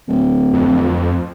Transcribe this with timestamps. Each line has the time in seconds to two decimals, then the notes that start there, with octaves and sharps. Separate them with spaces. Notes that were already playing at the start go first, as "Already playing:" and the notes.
0.08 D1
0.53 F2